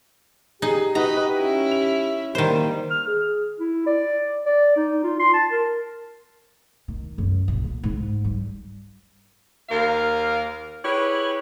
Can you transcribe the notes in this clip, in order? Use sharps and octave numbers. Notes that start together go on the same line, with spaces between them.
D#4 G4 G#4
D#4 F#4 B4 D#5 A#5
C#4 E4
F7
D#3 G3 A#3 C5
F6
G#4
E4
D5
D5
D#4
F4
C6
A5
A#4
D#3
F#2
A#1
A#3
G#2
G3
D#2 A#3 A#4 F5
E4 G4 G#4 B4 C#5